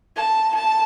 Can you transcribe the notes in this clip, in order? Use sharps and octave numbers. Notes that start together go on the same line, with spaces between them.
A5
A5